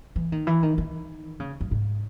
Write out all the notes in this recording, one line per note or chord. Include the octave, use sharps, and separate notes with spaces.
E3
D#3
E3
D#3
D#3
C#3
F#2
G#2